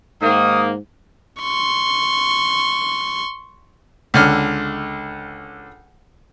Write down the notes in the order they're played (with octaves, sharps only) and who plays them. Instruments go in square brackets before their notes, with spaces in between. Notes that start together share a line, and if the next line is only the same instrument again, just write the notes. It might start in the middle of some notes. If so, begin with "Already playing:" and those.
[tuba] G#2 [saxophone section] D#3 A#3 [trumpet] D#6
[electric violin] C6 C#6
[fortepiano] C#2 D3 F6